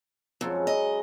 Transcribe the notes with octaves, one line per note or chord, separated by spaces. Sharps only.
F2 C#3 F#3 G#3
D#5